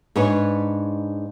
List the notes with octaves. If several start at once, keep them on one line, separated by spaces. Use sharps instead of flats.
G#2 D4 B4 C#5